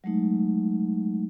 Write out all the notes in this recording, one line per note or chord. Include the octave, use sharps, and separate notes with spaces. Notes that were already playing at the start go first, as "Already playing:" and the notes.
F#3 G#3 A3 D#4